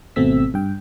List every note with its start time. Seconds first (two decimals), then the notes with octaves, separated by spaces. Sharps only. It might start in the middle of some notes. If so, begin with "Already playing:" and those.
0.16 G#1 B2 A3 C4 E6 B6
0.54 G2 G5